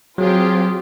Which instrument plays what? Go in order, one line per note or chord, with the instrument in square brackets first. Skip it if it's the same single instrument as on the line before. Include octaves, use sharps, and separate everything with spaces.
[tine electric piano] F#3 [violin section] C4 F4 G4 [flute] G#4